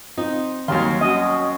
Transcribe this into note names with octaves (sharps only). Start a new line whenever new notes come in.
C4 D#4 F4
D#2 D#3 F#3 G3 C#5 F5 C6
C#4 F#4 D#5